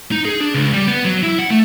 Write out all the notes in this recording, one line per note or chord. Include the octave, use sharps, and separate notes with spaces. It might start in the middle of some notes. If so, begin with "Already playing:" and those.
D#4
G#4
D4
C#2
G3
B3
F#3
E4
F#5
A3